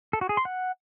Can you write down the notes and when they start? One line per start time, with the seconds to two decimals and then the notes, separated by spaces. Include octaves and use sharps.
0.13 A4
0.21 F#4
0.29 G#4
0.37 C6
0.45 F#5